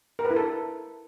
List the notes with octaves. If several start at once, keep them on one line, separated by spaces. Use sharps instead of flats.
A#4
B4
E4
A4